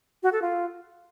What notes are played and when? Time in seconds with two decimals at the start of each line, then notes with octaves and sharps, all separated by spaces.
0.23 F#4
0.32 A4
0.42 F4